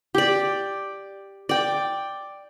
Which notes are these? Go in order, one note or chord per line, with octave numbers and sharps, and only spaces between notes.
G4 D5
D5 G5